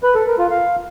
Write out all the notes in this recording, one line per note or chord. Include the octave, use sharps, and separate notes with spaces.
B4
A4
A#4
F4
F5